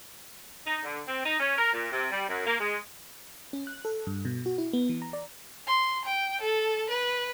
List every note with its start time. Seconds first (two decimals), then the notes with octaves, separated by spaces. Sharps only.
0.67 D#4
0.84 D3
1.08 C4
1.26 D#4
1.40 C#4
1.58 A#4
1.73 A#2
1.92 C3
2.11 G3
2.29 F#2
2.46 A#3
2.60 G#3
3.53 C#4
3.67 F#6
3.85 A4
4.07 G2
4.25 B2
4.46 F#4
4.58 E4
4.73 B3
4.89 E3
5.02 A#5
5.13 D5
5.67 C6
6.05 G5
6.41 A4
6.90 B4